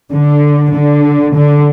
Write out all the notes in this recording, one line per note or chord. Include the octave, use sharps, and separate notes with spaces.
D3
D3
D3